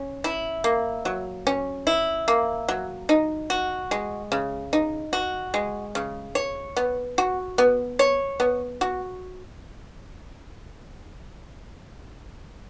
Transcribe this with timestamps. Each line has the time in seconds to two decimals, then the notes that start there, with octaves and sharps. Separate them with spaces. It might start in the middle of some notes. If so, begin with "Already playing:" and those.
Already playing: C#4
0.24 E4
0.64 A#3
1.05 F#3
1.47 C#4
1.87 E4
2.28 A#3
2.68 F#3
3.09 D#4
3.50 F#4
3.91 G#3
4.32 C#3
4.73 D#4
5.13 F#4
5.54 G#3
5.95 C#3
6.35 C#5
6.76 B3
7.18 F#4
7.58 B3
7.99 C#5
8.40 B3
8.81 F#4